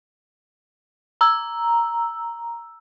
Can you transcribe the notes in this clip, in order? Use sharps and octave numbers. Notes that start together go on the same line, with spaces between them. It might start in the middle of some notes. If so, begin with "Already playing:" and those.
A#5 E6